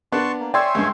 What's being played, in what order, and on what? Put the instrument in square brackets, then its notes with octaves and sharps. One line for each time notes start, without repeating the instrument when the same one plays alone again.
[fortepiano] B3 D4 F#6 [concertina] A5 C6 C#6
[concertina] A#3
[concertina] C#5 E5 G#5 [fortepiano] D5 [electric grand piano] G5 C6 E6
[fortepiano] C#2 G2